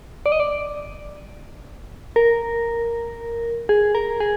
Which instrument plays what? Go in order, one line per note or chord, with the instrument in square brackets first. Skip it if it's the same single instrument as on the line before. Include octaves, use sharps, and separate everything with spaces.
[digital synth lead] D5
D#5
D5
A#4
G#4
A#4
G#4